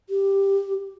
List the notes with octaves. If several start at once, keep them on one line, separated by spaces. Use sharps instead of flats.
G4